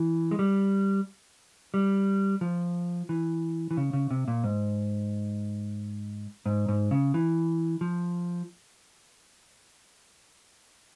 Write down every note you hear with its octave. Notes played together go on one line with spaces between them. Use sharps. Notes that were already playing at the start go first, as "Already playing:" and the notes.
Already playing: E3
G#3
G3
G3
F3
E3
E3
C#3
C#3
C3
A#2
G#2
G#2
G#2
C#3
E3
F3